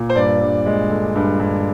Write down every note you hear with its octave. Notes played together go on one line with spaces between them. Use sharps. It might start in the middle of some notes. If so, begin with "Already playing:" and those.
Already playing: A#2
C5
G2 D5
G2
G#3
D3
G2
G2